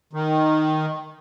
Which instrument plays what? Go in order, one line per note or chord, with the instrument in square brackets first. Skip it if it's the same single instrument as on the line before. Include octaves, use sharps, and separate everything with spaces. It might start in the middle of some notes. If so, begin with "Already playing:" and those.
[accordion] D#3